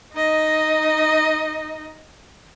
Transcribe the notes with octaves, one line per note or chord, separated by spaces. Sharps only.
D#4 D#5